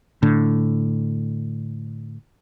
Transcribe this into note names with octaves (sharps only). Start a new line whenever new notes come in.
A2 D3